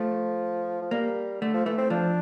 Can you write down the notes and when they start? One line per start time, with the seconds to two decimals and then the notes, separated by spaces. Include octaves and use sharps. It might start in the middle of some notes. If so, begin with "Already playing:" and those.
Already playing: F3 A3
0.82 F3
0.91 G3 A#3
1.42 D3 A3
1.54 F3
1.66 E3 A3
1.78 C4
1.90 F3 D4